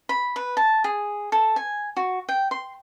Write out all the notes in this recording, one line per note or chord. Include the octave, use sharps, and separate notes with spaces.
B5
B4
A5
G#4
A4
G#5
F#4
G5
C6